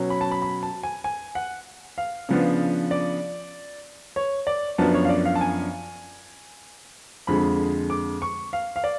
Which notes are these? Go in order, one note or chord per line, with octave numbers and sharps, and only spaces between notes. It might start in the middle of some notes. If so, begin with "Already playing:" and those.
Already playing: B2 F#3 C#4
B5
A5
B5
B5
A5
G#5
G#5
F#5
F5
C#3 F3 B3 D4
D5
C#5
D5
F#2 F3 B3 D4 A5
C#5
F5
D5
F5
A5
G#5
F2 D3 G#3 B5
D6
C#6
F5
F5
D5